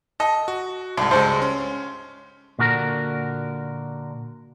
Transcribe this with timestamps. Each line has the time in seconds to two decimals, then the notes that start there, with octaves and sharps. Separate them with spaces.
0.20 A4 D#5
0.48 F#4
0.97 C2 G#2 D3
1.11 C#2 G2 G#3 A4 C5
1.42 C#4
2.59 A#2 D3 F#4 A#4